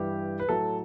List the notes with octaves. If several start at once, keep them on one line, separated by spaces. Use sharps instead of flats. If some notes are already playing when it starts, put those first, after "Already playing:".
Already playing: G2 E3 G3 G4
B4
A2 F#3 A3 A4